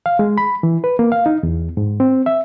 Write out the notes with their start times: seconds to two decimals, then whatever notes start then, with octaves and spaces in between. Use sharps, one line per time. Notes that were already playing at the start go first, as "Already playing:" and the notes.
0.06 F5
0.19 G#3
0.38 B5
0.63 E3
0.84 B4
0.99 A#3
1.12 F5
1.26 D#4
1.43 E2
1.77 G#2
2.00 C4
2.26 E5